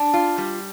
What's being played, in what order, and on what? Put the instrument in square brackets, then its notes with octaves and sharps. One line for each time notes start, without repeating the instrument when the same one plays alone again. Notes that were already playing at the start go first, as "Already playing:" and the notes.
Already playing: [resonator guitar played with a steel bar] D4
F4
G3